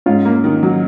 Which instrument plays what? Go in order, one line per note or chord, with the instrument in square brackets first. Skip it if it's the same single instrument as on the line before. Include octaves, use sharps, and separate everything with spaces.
[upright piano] G#2 [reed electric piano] C#4 F4
[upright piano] A#3
D#3
F#3